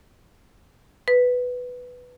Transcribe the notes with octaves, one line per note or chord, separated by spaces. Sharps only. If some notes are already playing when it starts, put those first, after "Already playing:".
B4